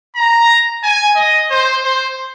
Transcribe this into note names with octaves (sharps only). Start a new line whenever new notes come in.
A#5
G#5
D#5
C5
C5